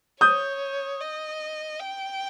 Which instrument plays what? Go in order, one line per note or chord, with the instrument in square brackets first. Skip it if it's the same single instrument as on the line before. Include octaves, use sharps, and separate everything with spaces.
[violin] C#5 [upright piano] D#6 G6
[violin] D#5
G5